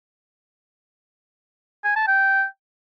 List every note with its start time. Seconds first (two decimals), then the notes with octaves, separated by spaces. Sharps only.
1.84 G#5
1.96 A5
2.07 G5